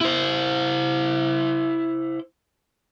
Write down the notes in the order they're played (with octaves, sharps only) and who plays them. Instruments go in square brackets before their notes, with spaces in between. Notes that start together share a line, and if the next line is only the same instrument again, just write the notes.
[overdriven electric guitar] E4 C5